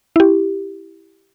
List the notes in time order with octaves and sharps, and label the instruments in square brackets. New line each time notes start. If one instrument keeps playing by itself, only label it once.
[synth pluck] E4 G4